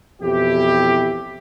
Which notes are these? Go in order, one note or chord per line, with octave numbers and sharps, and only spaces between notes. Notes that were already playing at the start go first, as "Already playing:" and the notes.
F2 B2 E3 E4 G4